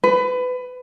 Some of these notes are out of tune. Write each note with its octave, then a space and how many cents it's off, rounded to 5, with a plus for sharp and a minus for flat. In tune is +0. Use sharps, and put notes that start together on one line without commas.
B4 +25